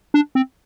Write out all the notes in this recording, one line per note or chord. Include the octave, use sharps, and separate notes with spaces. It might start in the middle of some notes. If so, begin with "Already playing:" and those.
D4
C4